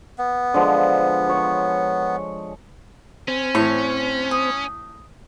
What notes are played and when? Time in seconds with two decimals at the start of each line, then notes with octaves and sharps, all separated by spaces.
0.18 B3
0.54 D3 F3 G#3
1.29 C#5
3.28 C4 C#4
3.55 A2 C#6
4.31 D#6